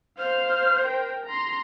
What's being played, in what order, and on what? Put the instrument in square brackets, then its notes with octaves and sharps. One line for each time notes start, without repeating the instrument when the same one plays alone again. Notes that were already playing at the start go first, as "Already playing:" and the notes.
[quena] C5 [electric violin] F5 F6
[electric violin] A#4 G5
A#5 C6